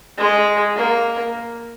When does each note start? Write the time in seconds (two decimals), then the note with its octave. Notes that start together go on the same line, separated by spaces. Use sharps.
0.18 G#3
0.77 A#3